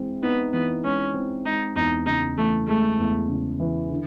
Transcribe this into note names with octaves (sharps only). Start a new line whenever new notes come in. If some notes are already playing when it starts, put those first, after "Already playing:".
Already playing: E3 G#3 C4
B3 D#4
E3 B3
G#3 C#4
C4
G#3 D#4
E2 D#4
C#3 D#4
E3 A3
G#3 A3
E2
C#3
E3
D3